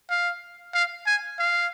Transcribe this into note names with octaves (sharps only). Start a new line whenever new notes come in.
F5
F5
G#5
F5